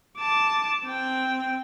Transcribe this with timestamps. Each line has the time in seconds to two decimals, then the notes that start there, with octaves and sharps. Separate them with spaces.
0.17 A5 D6
0.85 C4 G5